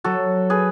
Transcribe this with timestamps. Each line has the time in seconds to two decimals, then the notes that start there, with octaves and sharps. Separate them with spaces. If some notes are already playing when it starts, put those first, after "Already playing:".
0.04 F#3 F#4 A4
0.50 G#4 B4